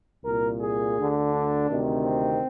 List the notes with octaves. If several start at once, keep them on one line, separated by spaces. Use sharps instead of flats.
C2 A#2 A#4
G#4
D2 D3
D4
D2 C3 D#3
C4